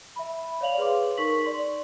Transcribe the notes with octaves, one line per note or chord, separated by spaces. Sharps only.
E5 B5
C#5 D5 F5 F7 F#7
G#4 B4 C#5 C6 D6
D#4 A#4 C#6 B6 F#7
D5 C6 F#7